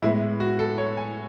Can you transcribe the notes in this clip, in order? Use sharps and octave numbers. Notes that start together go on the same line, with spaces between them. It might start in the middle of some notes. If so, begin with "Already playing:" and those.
A2 G#3 B3 E4
F#4
A4
C#5
G#5